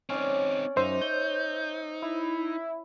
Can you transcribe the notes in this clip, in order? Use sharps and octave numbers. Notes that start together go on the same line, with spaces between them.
C4 C#4 D#4 D5
F#2 D#4 C5 E5 D6
C#5 G6
E4